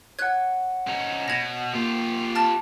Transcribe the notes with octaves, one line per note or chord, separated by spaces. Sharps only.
C#5 F#5 F#6 G#6
C#4 D#4
B2 G#6 A#6
A#3 F4 G4
A5 F6 A6